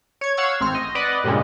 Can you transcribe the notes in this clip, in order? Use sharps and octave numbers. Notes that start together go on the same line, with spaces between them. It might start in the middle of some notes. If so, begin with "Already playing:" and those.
C#5 G#6
C#5 F5 F#5 C#6 E6 G#6
A1 C4 F6
D#5
B4 D5 D#5 F#5
G2 A#2 C#3 G3 G#3